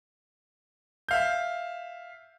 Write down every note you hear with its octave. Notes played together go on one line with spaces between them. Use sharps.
E5 F5 G6